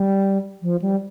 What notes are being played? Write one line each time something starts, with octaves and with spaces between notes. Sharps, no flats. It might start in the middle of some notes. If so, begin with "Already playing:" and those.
Already playing: G3
F3
G3